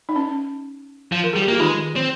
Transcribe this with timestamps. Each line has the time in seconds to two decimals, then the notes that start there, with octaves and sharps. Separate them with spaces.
0.09 D#4
0.16 C#4
1.12 F3
1.24 A#4
1.33 G3 G#4
1.42 G4
1.48 A#3 F4
1.60 D#3 G#3 D#4
1.96 C4